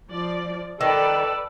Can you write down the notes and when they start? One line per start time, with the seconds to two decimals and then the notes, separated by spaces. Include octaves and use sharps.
0.11 F3 D5
0.81 D#3 A4 B4 D5 E6